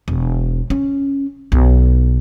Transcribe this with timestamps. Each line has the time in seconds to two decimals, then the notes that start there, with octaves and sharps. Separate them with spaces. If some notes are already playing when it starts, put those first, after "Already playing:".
0.08 E1
0.70 C#4
1.52 B1